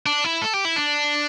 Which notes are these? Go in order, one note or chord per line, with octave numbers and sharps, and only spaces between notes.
D4
E4
A4
G4
E4
D4